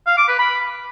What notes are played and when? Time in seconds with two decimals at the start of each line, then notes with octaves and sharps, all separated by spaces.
0.07 F5
0.17 D6
0.28 B4
0.39 B5